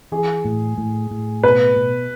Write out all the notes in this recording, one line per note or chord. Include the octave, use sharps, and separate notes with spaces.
E3 G#4
A2
A2
A2
B2 B4
B2